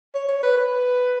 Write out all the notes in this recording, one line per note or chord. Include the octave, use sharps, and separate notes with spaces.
C#5
C#5
B4
B4